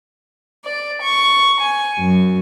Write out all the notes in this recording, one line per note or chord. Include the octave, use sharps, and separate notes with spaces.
D5
C#6
G#5
F#2